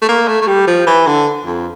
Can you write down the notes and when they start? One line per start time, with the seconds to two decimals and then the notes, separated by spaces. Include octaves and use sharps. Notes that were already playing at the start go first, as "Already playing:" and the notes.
0.02 A3
0.08 A#3
0.28 A3
0.41 A3
0.47 G3
0.67 F3
0.87 E3
1.07 D3
1.46 F2